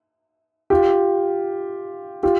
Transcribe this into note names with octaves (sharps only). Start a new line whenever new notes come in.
F4 G4
F4 G4